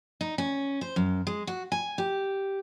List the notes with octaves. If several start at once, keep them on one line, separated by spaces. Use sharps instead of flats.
D#4
C#4
C5
F#2
G#3
F#4
G#5
G4